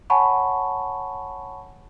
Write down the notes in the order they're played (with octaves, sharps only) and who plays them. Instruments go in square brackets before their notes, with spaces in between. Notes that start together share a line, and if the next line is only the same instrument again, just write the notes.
[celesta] C#5 F#5 G#5 A5 B5 C#6